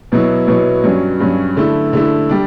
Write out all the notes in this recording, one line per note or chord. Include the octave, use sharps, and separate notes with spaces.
B2 F#3 B3 E4
B2 F#3 B3 E4
G2 F#3 C#4
G2 F#3 C#4
D3 A3 E4
D3 A3 E4
G3 D4